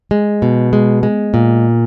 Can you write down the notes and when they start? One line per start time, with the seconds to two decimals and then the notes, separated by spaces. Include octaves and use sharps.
0.11 G#3
0.42 B2
0.73 G#3
1.03 G#3
1.34 A#2